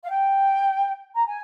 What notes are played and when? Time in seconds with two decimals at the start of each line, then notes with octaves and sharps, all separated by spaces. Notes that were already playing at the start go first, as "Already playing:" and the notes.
0.04 F5
0.09 G5
1.15 A#5
1.26 G#5